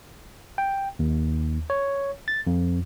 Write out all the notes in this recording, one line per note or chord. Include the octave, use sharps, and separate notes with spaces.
G5
D#2
C#5
A6
F2